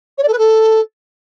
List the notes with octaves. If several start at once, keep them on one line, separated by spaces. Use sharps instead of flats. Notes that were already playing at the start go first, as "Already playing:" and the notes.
C#5
D5
A4
B4
A4